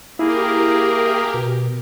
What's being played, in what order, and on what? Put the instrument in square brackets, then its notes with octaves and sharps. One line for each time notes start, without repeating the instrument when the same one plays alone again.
[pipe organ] A#3 G#4 [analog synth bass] E4 [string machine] G4 A#4
[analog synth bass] B2